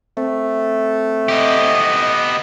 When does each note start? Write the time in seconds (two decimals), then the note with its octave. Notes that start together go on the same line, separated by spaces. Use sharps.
0.17 A3 C4
1.29 B3 G4 D#5